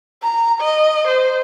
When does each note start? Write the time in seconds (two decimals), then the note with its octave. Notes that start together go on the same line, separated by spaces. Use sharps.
0.23 A#5
0.61 D#5
1.08 C5